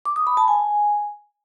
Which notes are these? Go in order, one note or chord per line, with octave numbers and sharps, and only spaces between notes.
D6
D#6
B5
A5
G#5